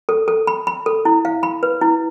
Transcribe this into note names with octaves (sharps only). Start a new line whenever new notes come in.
A4
A4
B5
B5
A4
E4
F5
B5
B4
E4